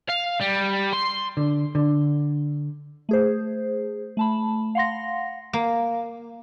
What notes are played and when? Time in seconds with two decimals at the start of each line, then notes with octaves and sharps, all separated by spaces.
0.10 F5
0.41 G3
0.93 C6
1.37 D3
1.75 D3
3.09 A3 G#4 C5
4.17 A3 A5 B5
4.75 F5 F#5 C6 A#6
5.53 A#3